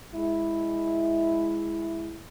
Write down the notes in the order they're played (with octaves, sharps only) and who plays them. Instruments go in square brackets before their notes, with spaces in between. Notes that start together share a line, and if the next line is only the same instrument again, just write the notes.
[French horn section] G#3 E4